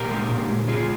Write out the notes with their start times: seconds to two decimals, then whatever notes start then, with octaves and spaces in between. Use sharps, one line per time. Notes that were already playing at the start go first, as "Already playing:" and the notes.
Already playing: A#2 G4 A#4
0.11 G#3
0.30 A#2
0.49 G#3
0.68 G#3 F4 G#4
0.80 F4